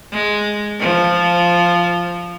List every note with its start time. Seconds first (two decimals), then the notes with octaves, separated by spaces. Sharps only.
0.11 G#3
0.80 F3